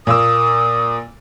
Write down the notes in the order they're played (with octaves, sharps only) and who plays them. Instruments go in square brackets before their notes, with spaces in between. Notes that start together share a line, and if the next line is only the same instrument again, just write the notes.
[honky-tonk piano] A#2 A#3 E6 [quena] D#6